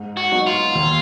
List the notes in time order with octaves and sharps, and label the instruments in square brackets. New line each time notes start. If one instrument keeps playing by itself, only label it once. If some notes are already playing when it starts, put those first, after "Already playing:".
Already playing: [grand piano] G#2
[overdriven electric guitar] F#4
[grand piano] F#3 B3 D#4
[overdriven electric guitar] F4
[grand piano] D#2